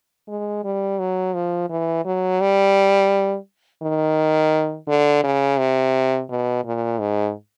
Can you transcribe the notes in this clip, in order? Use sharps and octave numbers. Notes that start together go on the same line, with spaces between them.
G#3
G3
F#3
F3
E3
F#3
G3
D#3
D3
C#3
C3
B2
A#2
G#2